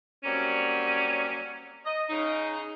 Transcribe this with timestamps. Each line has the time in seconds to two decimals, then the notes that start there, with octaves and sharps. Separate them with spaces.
0.24 F#3 G3 A#3 C4 C#4
1.85 D#5
2.09 C#3 D#4